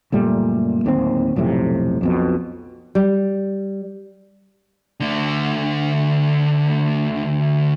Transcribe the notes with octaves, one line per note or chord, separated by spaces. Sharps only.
F#1 A#2 G3 A3
D1 D#2 C#3 C4
B1 F2 A2 C3
B1 F2 B2
G3
D2 D3